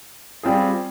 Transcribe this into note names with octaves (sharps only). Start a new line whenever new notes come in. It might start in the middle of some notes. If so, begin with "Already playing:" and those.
G3 C4 F4 G#4